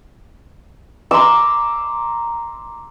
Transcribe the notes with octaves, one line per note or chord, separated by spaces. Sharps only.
A#5 C6 D6 E6